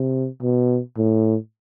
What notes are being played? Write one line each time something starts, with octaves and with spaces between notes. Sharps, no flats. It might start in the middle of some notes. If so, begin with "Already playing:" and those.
Already playing: C3
B2
A2